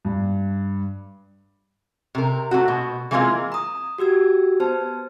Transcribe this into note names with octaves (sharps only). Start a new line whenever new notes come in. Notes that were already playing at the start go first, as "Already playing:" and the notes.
G2
C3 A#4
A3 C4 F#4
B2
E3 G#3 A#3 C4 F4 G#4
A#5 D#6
F#4 G4 E6 G#6
B3 C5 A5